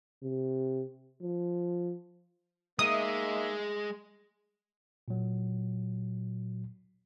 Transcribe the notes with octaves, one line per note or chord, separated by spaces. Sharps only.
C3
F3
G#3 A#3 D#4 E5 D#6
A#2 F#3